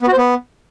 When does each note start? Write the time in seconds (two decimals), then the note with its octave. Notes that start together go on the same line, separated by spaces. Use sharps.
0.02 B3
0.08 F#4
0.13 C5
0.18 B3